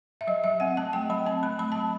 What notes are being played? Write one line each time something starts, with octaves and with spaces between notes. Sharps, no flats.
E5
F#3 D#5
F#3 E5
C4 F#5
A3 A5
F#3 G5
F#3 B5
C4 A5
A3 B5
F#3 B5
F#3 A5